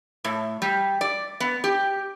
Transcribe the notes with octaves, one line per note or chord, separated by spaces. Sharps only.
A2
G3
D5
B3
G4